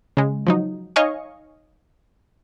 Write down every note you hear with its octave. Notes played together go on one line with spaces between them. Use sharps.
C#3 G#3
F3 F#3 D#4
D#4 C#5 D#5 F5 G#5 C#6